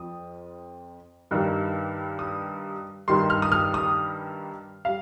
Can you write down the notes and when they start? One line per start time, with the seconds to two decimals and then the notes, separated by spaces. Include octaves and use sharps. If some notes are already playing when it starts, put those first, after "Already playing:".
Already playing: F2 F3 D#6
1.31 G2 D#3 G3
2.19 D#6
3.08 G2 D#3 G3 C6
3.30 F6
3.42 D#6
3.52 F6
3.74 D#6
4.85 G3 F5